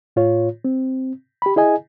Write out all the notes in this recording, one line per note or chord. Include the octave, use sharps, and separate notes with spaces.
A2 F4 C#5
C4
G4 B5
E4 G#4 D#5 G#5